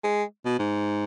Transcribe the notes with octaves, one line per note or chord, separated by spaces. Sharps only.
G#3
B2
G#2